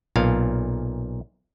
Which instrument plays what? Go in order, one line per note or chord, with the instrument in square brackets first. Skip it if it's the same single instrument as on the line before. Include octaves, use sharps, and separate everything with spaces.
[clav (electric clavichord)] B1 A#2 F5